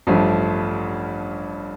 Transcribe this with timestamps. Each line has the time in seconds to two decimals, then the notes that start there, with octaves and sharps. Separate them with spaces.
0.07 A1 G2 F3 A3